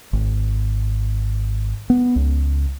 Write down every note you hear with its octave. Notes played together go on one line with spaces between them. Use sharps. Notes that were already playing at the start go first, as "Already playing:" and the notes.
G#1
B3
C#2